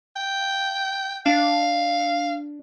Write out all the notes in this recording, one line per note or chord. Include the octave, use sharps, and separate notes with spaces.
G5
D4 F5